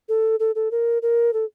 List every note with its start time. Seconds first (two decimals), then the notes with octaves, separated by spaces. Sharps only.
0.09 A4
0.40 A4
0.55 A4
0.71 A#4
1.02 A#4
1.33 A4